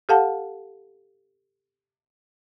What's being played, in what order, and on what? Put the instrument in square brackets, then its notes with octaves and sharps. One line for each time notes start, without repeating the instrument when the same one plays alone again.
[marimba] G4 A4 F5 F#5 A5